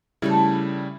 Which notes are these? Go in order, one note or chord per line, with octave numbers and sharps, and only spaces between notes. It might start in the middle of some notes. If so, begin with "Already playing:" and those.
C#3 G3 A3 D4 E4 A4